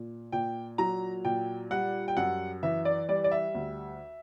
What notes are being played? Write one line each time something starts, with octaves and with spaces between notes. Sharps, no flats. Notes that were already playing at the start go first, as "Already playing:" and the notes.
Already playing: A#2
A#2 G5
F#3 A#5
A#2 G5
G3 F#5
G5
F#2 F#5
E3 E5
D5
G3 D5
D5
E5
D2